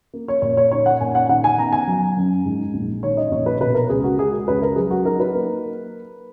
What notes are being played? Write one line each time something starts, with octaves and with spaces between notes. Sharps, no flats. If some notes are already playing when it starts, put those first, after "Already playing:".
A#3
C#5
A#2 C#5
C#5
D#4 C#5
F#5
A#2 G#5
F#5
D#3 F#5
G#5
B3 A#5
G#5
F#3
F#2
G#2
A#1
D#3 C#5
D#5
A#1 C#5
B4
B2 B4
A#4
C#2 G#4
F#4
G#3 G#4
C#2 B4
A#4
F#3 G#4
F#4
D#4 A#4
B4
A#3